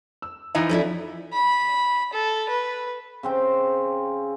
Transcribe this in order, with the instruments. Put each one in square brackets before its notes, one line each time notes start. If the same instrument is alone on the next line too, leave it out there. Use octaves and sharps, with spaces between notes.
[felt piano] E6
[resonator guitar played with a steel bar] E3 F3 D#4 [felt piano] E5 A#5
[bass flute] F3 [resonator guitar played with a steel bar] C#4 D#4 E4 [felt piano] A4 D5
[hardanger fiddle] B5
A4
B4
[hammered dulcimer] C#3 C4 G5